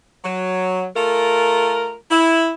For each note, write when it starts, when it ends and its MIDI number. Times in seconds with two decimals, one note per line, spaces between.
0.24 0.86 54
0.96 1.95 57
0.96 1.95 65
0.96 1.95 70
2.11 2.53 64